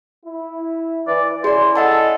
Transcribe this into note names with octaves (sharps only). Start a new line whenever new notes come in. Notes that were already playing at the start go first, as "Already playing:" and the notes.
E4
E3 D5
C#4 E4 G#4 D5 C6
A4 D#5 F#5 A5